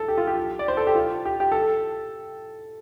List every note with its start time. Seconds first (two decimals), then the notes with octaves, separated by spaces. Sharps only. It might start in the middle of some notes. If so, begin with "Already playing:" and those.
Already playing: A4
0.08 G4
0.18 F4
0.27 G4
0.59 D5
0.68 C5
0.77 A4
0.87 G4
0.95 F4
1.25 G4
1.40 G4
1.52 A4